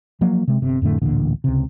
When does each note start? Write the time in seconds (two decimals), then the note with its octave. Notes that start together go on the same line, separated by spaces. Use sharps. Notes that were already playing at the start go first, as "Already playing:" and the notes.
0.21 F3 F#3 A#3
0.48 C3 G#3
0.62 G1 C3 C4
0.82 F2 A2 D3 A3
1.02 A1 D2 A#2 D3
1.44 C#2 C3